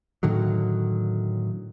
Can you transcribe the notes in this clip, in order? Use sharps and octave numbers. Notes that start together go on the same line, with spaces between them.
A2 D3 D#3 F#3